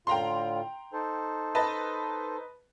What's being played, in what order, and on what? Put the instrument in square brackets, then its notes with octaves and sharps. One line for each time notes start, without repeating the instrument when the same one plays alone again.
[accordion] A2 D3 F4 [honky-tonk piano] G5 A#5 C6
[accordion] D#4 A4 C5
[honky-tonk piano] B4 D#5 A5